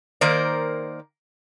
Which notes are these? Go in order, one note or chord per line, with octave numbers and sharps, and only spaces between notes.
D#3 A#3 A#4 C5 D5